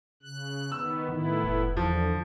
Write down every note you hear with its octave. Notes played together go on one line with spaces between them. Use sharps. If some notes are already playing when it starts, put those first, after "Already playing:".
C#3 F#6
D#3 B3 E6
A2 D#3 B3 E4
F1
E2 D3 F3